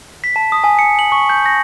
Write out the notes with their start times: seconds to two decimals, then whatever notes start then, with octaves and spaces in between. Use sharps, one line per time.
0.24 B6
0.36 A5
0.52 D#6
0.64 G#5
0.79 C#7
0.99 F#7
1.12 C#6
1.29 G6
1.46 A#6